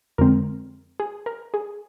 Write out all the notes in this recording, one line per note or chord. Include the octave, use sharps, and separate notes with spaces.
F2 D3 G#3 C4 A#4
G#4
A#4
G#4